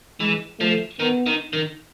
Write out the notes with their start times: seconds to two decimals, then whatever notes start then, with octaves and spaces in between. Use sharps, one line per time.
0.20 E3 G#3
0.60 F3 A3
1.00 D#3 B3
1.26 D#3
1.53 D#3